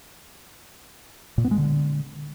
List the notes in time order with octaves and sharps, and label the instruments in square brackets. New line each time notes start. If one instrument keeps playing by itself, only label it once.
[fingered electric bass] A#2
B3
G#3
D3